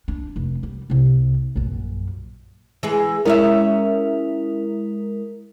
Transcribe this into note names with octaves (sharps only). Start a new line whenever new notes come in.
D4
F1
G3
C2 C3
A#1 F#2
E3 G#3 G#4
G#3 C#4 E4 A#4 D5 E5